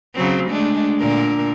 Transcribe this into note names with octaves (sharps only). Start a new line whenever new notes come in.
C#3 F#3 C4
G#3 A3 D4
A#2 D3 A#4